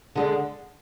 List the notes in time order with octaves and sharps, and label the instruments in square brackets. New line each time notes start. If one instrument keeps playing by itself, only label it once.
[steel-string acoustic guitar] D3 G#3 D4